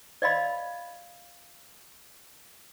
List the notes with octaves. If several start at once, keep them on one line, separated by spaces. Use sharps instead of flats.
D5 D#5 F5 B5